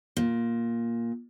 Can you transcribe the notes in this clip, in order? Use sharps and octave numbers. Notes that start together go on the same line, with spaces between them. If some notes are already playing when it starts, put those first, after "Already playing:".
A#2